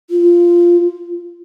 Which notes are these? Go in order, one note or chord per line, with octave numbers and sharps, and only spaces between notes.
F4